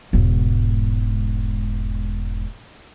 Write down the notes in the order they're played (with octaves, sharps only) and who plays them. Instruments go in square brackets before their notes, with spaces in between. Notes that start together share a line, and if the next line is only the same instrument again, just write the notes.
[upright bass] E1 G#2